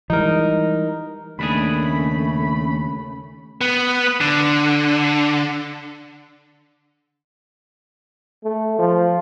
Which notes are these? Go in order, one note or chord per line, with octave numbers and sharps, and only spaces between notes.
E3 G3 G#3 D#4 A#4
D#2 C#3 A3 C#4 D4 G#4 B5
B3
D3
A3
F3